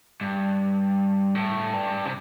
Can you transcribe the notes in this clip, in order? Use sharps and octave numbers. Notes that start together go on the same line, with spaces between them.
G2
A2
G2
C3